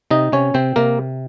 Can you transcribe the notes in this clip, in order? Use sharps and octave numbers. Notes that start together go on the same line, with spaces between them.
C3 D#4 D#5
C3 C#4 C#5
C3 C4 C5
C3 A#3 A#4